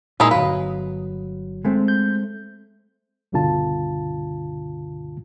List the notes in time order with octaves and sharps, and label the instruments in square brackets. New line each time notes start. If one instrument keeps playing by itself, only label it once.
[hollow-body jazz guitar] A#2 [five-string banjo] G#3 D#4 E4 [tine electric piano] A#4
[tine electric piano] G1 F#3 [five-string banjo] B4 [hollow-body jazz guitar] F5
[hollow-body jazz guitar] G#3 A3 C4
[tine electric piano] G6
[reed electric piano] C#2 G2 B2 D3 F4 A5